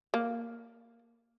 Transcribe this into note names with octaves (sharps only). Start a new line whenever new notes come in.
A#3